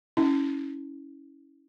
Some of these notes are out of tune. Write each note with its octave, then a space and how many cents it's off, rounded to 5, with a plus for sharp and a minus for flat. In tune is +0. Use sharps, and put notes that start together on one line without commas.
C#4 +0 E4 -25